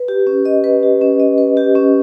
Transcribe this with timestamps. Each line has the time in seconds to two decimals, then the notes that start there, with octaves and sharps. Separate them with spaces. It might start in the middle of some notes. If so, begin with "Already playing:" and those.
Already playing: B4
0.08 G4
0.27 C#4
0.45 D#5
0.64 B4
0.83 G4
1.01 C#4
1.20 D#5
1.38 B4
1.57 G4
1.75 C#4